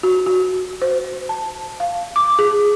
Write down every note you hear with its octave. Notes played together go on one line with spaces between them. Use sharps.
F#4
F#4
C5
A5
F5
D6
G#4